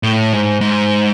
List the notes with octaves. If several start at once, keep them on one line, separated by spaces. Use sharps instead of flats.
A2
G#2
G#2